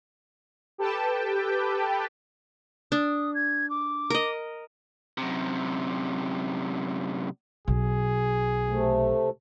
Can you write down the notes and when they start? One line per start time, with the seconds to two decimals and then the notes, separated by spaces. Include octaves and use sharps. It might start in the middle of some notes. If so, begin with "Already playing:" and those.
0.78 G4 A4 B4 G5 A5
2.92 D4 D#6
3.35 G#6
3.70 D6
4.10 A#4 D#5
5.18 F#2 C3
7.68 B1 G#4
8.69 C3 A3